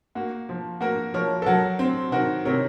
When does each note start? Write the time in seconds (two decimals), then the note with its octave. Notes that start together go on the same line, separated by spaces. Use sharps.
0.15 A#3 F#4
0.49 F3
0.81 A#3 F#4 A#4
1.14 F3 A#4 C#5
1.42 A4
1.46 F#3 F#4 A#4
1.79 C4
2.12 D#3 F#4 A#4
2.45 C3 A#4 C#5